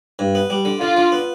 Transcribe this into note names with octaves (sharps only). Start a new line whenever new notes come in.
G2
B3
G3
D3
D3 F4
D3
B3